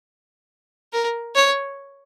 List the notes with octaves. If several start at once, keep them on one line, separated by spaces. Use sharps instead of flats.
A#4
C#5